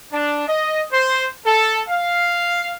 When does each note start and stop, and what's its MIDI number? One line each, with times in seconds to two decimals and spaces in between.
0.12 0.45 62
0.48 0.82 75
0.91 1.26 72
1.45 1.80 69
1.88 2.74 77